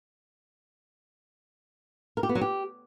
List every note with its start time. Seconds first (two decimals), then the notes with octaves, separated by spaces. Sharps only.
2.17 A#4
2.23 G4
2.29 B3
2.35 F#3
2.41 G4